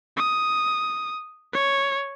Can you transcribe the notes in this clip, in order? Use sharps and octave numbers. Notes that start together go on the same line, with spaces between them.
D#6
C#5